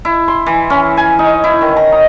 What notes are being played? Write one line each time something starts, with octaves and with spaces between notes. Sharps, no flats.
E4
C6
E3
C#4
G#5
D#4
E4
D#3
A#5
D#4